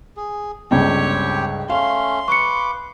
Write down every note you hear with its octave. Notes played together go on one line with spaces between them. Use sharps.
G#4
G1 C#2 C4 G4 C#5 G5
A3 C#4 F5 C6
B4 C#6 D6 C#7